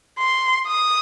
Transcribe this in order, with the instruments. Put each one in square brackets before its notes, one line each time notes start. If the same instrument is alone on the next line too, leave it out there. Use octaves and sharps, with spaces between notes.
[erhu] C6
D#6